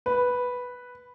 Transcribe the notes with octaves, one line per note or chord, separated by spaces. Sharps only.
B4